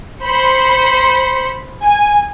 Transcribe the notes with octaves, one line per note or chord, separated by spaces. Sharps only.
C5 B5 C#7
G#5